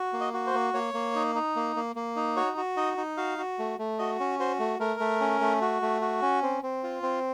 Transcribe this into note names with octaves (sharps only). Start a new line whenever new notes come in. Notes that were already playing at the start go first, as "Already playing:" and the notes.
Already playing: F#4
A#3
D#5
F#4
C5
A#3
A#3 C#5
A#3
D#4
D#4
A#3
A#3
A#3
D#4
F#4 C#5
F#4
D#4 D#5
D#4
F#4 F5
F#4
A3
A3
F#4 D#5
C#4
F#4 C5
A3
A3 A#4
A3
C#4
A3
F#4
A3
F#4
C#4
C4
C4
F4
C4